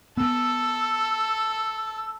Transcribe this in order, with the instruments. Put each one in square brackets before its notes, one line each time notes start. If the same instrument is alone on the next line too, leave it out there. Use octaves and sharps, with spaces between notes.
[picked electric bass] B3 [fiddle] A4 [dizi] E6